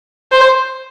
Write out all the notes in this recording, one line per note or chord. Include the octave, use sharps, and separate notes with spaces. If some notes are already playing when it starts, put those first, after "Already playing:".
C5